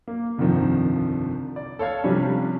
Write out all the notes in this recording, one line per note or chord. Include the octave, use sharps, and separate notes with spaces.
A#3
G1 C2 F2 D#3 F3
D5
A4 C#5 F5 G#6
C3 F3 G3 C#4 D4